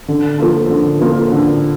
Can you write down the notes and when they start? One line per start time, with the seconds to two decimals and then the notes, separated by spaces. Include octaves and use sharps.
0.08 D3
0.39 F3 A#3 F4 A4
0.70 D3
1.01 F3 A#3 F4 A4
1.32 D3